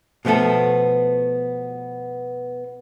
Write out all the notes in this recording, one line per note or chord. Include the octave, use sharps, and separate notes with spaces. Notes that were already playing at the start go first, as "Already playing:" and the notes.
B2 F3 A3 B3 A4